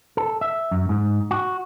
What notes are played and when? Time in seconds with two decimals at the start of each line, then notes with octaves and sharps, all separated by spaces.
0.17 A4
0.41 E5
0.71 F#2
0.89 G#2
1.31 F#4